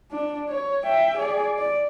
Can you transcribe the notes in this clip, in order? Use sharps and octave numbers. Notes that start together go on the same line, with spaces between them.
D4
C#5
E5 G5
G#4 D5
D5